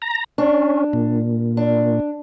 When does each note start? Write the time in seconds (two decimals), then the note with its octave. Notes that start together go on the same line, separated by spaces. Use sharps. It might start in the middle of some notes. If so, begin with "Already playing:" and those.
0.02 A#5
0.38 C#4 D4
0.93 A#2
1.57 D4